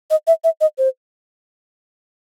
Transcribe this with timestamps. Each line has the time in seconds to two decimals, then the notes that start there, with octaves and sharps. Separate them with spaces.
0.10 D#5
0.27 E5
0.44 E5
0.61 D#5
0.78 C5